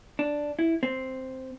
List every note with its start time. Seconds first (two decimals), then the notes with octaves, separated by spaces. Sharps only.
0.19 D4
0.59 E4
0.83 C4